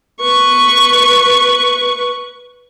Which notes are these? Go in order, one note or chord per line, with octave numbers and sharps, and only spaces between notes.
B4 C#6